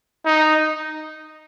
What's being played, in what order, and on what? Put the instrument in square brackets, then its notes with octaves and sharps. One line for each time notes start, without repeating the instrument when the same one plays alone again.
[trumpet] D#4